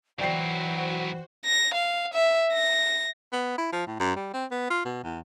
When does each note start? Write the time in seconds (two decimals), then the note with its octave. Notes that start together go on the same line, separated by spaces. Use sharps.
0.19 E3 F#3 E4 F#4 C5 D5 G5 C7
1.45 A#6
1.74 F5
2.13 E5
2.53 A#6
3.33 B3
3.58 E4
3.72 F3
3.87 A2
4.00 F#2
4.16 G3
4.33 C4
4.51 B3
4.70 F4
4.85 B2
5.03 E2